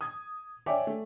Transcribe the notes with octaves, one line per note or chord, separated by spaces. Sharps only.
D#6 G#6
C#5 D5 E5 G5 G#5 D6
A3